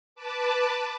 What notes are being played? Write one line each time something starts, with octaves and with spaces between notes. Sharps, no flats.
B4 A5 D6